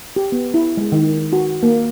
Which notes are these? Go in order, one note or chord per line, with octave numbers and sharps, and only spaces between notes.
G4
B3
E4
G#3
D#3
F#4
A#3